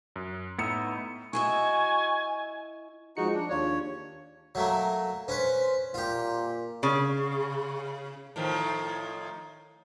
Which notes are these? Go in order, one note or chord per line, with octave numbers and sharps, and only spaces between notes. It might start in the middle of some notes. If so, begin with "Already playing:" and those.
F#2
A2 B3 D#4 E5 C#7
E4 F#4 D#5 E5 G#5
F3 G#3 D#4 F#4 C#7
D4
D#2 D4 F4 C#5
F#3 A3 A#3
C#4 B4 C5
A#2 F4 G4
C#3
A2 D#3 F3